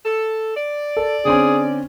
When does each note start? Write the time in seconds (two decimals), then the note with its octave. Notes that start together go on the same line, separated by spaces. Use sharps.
0.05 A4
0.56 D5
0.97 A4
1.25 D3 C4 C#4 G#4